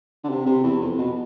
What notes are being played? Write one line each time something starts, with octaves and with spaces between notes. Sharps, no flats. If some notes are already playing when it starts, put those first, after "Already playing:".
D3
C3
C3
E2
F2
B2